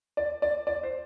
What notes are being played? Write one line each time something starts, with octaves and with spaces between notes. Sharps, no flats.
D5
D5
D5
C5